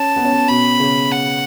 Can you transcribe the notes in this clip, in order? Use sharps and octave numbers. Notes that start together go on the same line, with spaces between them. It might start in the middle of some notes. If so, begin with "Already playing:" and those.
Already playing: C#4 A5
B3
C#4
B3
B2 B5
C#3
F#5